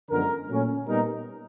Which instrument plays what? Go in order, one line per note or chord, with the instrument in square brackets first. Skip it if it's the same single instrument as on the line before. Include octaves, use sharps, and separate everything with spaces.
[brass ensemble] F#2 D3 F3 G#3 B3 A#4
A#2 F#3 A3 C#4
A#2 G3 B3 D#4 A#4